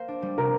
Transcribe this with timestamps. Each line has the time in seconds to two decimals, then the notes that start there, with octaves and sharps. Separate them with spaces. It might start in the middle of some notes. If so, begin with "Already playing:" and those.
Already playing: A#3 C5
0.08 D4
0.23 G3
0.38 C3 A#4